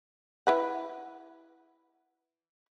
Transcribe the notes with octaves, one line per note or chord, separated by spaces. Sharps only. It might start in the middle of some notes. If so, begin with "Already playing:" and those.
E4 B4 F#5